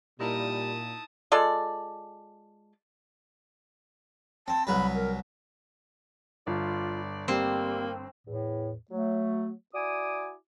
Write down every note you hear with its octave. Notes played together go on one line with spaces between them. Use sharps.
A#2 G3 D#4 E4 A#4 A5 D#6
G#3 F4 A4 D5
C4 A5
C2 F#3 B4 B5
A#4
G1 F4 D5
G3 A#3 C4
E2 A2
F#3 A3
E4 F#4 D5 G#5 D6 D#6